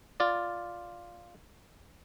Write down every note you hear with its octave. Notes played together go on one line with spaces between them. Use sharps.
F4 D5